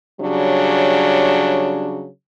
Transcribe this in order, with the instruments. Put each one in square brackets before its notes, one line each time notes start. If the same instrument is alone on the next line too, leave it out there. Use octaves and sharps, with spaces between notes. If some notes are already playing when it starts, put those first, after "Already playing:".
[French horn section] C#3 F#3 G3 D4